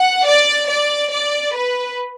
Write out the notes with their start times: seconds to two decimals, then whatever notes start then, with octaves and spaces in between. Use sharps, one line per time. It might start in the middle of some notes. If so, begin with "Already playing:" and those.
Already playing: F#5
0.25 D5
0.68 D5
1.11 D5
1.54 B4